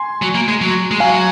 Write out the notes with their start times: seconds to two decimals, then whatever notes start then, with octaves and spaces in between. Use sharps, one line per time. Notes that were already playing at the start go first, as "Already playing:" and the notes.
Already playing: G#5 C6
0.22 F#3
0.35 A#3
0.48 G#3
0.61 F#3
0.91 G#3
1.00 F#3 F5 G#5